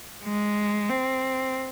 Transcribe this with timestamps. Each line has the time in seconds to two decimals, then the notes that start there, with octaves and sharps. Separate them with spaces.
0.24 G#3
0.89 C4